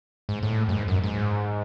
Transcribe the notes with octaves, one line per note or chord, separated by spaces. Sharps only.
G#2
A2
F#2
G#2
F#2
G#2